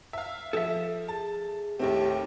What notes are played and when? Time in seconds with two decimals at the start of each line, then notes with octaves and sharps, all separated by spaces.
0.13 E5 F5
0.53 F3 A4 E5
1.08 G#4 A5
1.79 D#2 A2 D#3 C4 G4